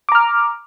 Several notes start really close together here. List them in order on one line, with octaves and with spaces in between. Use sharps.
D6 A#5 F6